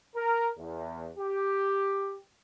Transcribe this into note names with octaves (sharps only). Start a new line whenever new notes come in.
A#4
E2
G4